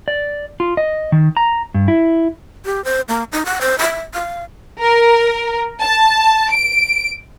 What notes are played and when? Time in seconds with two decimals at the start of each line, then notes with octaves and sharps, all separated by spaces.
0.08 D5
0.60 F4
0.77 D#5
1.12 D#3
1.37 A#5
1.74 G2
1.88 E4
2.65 G4
2.84 C5
3.09 A#3
3.32 D#4
3.46 F#5
3.61 C5
3.79 E5
4.14 F5
4.80 A#4
5.82 A5
6.51 D7